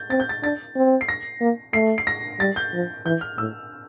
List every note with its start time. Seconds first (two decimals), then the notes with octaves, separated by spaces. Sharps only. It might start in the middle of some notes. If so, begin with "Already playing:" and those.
Already playing: G6 A6
0.10 C4 A6
0.20 G6
0.29 A6
0.42 D4 A6
0.76 C4
1.01 C7
1.08 A#6
1.41 A#3
1.73 A3 C7
1.98 C7
2.07 A#6
2.39 G3 A6
2.56 G6
2.73 F3
3.05 E3 G6
3.21 F6
3.38 A2 E6